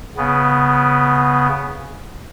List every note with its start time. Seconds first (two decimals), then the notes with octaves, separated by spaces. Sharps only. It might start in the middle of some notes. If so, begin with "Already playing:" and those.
0.17 C#3 B3